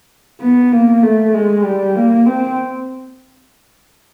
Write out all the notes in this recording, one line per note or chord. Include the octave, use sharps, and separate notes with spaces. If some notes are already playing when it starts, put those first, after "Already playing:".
B3
A#3
A3
G#3
G3
A#3
C4